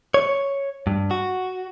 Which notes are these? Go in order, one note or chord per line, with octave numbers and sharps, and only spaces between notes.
C#5
G2
F#4